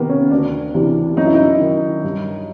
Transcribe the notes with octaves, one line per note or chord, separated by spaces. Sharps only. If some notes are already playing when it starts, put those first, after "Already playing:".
Already playing: C3 D#3 A#3 B3
C#4
D2 D4
C3 E3
F#2 D#4
E4
D#4
D#3
G2